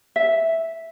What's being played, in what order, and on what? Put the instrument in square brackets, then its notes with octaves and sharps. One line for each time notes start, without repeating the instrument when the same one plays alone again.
[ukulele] E5